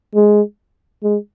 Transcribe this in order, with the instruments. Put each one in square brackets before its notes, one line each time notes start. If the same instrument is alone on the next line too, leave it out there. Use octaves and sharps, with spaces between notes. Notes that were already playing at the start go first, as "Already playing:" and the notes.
[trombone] G#3
G#3